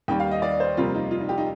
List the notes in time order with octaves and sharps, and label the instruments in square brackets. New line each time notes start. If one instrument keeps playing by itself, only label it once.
[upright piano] D#2 D#3 G3 G5
F5
D#5
D5
C5
F2 C3 G3 A#3 F4
D#4
F4
D#4
G4
D#4